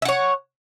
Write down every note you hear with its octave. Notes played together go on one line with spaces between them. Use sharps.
C#5 E5 F#5